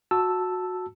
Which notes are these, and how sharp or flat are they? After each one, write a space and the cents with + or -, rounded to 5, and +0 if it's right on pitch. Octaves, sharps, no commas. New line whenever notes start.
F#4 -15 A5 +0 E6 +0